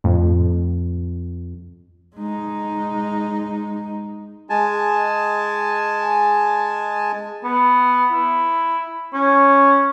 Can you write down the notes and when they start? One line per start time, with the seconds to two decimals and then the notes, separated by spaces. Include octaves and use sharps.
0.04 F2 A2
2.16 G#3 D#4
4.50 G#3 G#5 A5
7.44 B3
8.12 E4
9.14 C#4